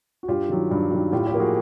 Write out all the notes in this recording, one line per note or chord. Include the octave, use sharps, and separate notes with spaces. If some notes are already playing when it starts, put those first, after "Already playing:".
F#4
G2 F4 G4
D#3 F#3
G2
D#3 F#3
A2 F4 G4
F4 G4
F3 A#3
F#4 G#4